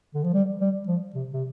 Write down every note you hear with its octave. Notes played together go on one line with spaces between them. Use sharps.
D3
F3
G3
G3
F3
C3
C3